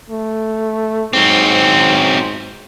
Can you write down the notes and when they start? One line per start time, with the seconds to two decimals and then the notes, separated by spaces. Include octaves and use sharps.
0.10 A3
1.13 G#2 F#3 C4